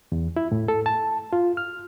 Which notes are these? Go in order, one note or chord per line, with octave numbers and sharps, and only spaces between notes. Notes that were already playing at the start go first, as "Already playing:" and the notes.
E2
E4
A2
A4
A5
F4
F6